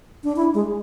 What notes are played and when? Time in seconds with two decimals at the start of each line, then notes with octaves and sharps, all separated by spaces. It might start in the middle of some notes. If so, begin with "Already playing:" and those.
0.24 D4
0.36 E4
0.54 G#3